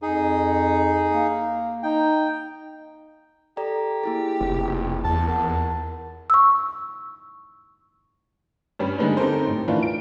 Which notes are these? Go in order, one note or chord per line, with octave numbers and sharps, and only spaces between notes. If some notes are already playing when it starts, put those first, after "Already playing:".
F2 D#4 G#4
A#3
D#4 G5
G4 A4 D5 A#5
A#3 E4 G#4
F1
E2 A5
A#4 F#5 A5
C#6 E6
G2 G3 C#4
D3 G3 G#3 B3 D4 D#4
C4 D#4 G4 A4 A#4 C5
A1
D#3 E3 A3 A#3 D4 F4
D7